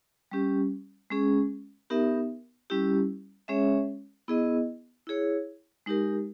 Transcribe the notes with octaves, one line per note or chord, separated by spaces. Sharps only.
G3 C#4 G4
G#3 C#4 G#4
B3 D#4 G4 A#4 E5
G3 C#4 E4 G4
G#3 C#4 G#4 C#5 E5
B3 E4 G#4 D#5
E4 G#4 C#5
G#3 D#4 G4 A#4